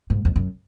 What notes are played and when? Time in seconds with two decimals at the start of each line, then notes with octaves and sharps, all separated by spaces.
0.10 G#2
0.25 F2
0.36 F#2